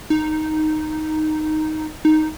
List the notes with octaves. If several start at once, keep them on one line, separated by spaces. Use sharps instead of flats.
D#4
D#4